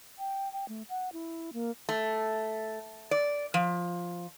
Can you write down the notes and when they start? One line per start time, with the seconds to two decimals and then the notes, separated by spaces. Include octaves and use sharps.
0.19 G5
0.53 G5
0.69 A3
0.89 F#5
1.13 E4
1.53 A#3
1.89 A3
3.11 D5
3.54 F3